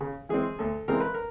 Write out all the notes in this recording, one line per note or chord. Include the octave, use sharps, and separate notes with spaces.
C#3
E3 G#3 C4 G#4
D2 A4
C#3 E3 G#3 C4 A#4
B4
A#4